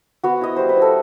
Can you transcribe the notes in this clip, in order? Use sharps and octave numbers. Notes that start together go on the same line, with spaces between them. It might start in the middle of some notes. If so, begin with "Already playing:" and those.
B3 F#4
E4 D#5
G3 C5
B4
E4
A4